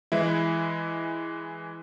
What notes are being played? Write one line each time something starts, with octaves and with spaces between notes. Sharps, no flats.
E3 G#3 E4